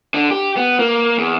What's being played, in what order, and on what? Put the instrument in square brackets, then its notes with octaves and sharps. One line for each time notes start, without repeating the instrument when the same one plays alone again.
[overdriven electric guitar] D3
G4
B3
A#3
E2